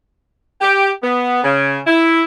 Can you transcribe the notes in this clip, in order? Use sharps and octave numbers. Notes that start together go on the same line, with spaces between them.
G4
B3
C#3
E4